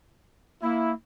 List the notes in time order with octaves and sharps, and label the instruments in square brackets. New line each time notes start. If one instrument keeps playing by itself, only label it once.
[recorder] A#3 [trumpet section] E4